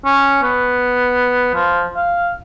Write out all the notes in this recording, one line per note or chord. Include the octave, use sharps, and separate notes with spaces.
C#4
B3
F3
F5